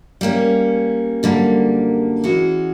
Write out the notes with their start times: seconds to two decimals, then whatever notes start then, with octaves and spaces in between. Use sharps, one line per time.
0.21 G3 A#3 C#4
1.23 F#2 D3 G3 A#3
2.24 E3 G#3 C#4 F#4